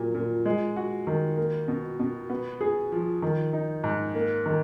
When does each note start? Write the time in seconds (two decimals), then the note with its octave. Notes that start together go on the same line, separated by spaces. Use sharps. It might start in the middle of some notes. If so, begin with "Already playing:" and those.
Already playing: A#2 F#3
0.14 A#2
0.46 G#3
0.76 F#4
1.07 D#3
1.37 A#3
1.68 B2
1.99 B2
2.30 B3
2.61 G#4
2.92 F3
3.22 D#3
3.53 D#4
3.84 G#2
4.15 A#3
4.46 D#3